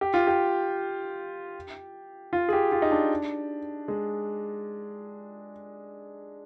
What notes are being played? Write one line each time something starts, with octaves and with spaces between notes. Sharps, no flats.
G4
F4
G4
F4
G#4
G4
F4
D#4
D4
G#3